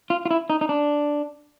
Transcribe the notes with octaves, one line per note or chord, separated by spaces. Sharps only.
F4
F4
E4
D#4
D#4
D4